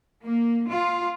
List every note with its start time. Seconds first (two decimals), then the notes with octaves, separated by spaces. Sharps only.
0.25 A#3
0.69 F4